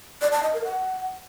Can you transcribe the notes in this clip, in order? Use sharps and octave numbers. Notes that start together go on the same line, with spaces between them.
D5
A5
D#5
A#4
F#5